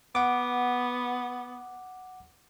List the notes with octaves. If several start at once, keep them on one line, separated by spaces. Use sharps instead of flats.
B3 F#5 D6